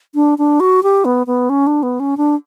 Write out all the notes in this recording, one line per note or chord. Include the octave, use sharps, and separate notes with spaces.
D4
D4
F#4
G4
B3
B3
C#4
D4
B3
C#4
D4